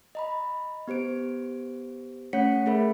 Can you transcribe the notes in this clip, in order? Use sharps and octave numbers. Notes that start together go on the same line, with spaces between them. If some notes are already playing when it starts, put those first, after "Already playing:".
D#5 A#5 B5
B3 G4 C5 D7
A3 C#4 C#5 F#5 B6 C#7
A3 G#4 A#4 E5 B5